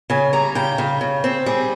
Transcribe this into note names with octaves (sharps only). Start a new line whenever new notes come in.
C#3 G#5
G3 A#5
C#3 G5
C#3
C#3
C4
G3 G#4